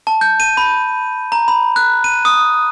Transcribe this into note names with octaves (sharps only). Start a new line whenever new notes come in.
A5
G6
D#7
B5
A#5
B5
F#6
D#7
D#6